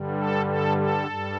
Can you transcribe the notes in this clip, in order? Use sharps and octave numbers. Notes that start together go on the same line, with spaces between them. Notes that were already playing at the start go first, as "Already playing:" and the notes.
Already playing: G2 D3 G3
A4
A4
A4
G2 G3